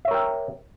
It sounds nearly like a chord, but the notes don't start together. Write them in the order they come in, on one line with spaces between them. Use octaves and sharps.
E5 C#5 A#4 G5